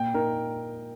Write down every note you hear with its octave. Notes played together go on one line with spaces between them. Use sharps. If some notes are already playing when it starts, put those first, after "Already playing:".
Already playing: A#2 G5
D#4 A#4